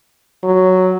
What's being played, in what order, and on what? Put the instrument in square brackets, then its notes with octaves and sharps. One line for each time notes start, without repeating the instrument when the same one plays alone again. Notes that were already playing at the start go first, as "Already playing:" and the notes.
[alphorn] F#3